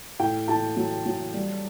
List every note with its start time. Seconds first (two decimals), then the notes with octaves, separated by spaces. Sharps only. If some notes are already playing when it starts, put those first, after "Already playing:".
0.19 A2 G5
0.48 A2 A5
0.77 F#3
1.06 F#3
1.34 G3